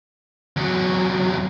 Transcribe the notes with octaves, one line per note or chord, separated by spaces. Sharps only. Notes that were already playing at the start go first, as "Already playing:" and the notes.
E2 F#3